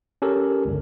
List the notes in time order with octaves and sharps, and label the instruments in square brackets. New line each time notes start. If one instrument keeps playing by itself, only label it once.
[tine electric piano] C#4 G4 A4 A#4
G1 C#2